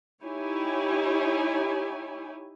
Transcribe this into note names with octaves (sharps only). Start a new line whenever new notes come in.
D#4 E4 G4 C#5 G#5